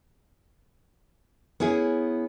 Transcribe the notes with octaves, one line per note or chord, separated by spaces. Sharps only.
B3 C#4 E4 G#4